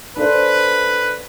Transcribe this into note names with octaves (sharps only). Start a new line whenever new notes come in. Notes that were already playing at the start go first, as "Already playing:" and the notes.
D4 A4 B4 C5